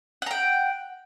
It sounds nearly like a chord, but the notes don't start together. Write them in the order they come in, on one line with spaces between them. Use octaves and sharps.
F#5 A#5 G5